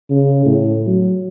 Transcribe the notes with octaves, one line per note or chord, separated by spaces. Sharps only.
C#3
A2
F#3